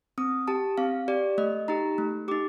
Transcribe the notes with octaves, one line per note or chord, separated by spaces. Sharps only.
C4 D#6
G4 A5
C4 F5
G4 D5
A3 D#5
D#4 G4 A#5
A3
D#4 G4 D6